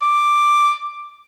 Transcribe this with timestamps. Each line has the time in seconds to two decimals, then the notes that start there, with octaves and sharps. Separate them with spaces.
0.02 D6